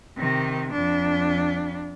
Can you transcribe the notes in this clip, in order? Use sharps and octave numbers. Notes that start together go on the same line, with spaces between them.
C3 D#3
F2 D4